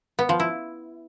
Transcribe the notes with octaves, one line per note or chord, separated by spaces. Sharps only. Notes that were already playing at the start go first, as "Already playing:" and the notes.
B3
F3
E4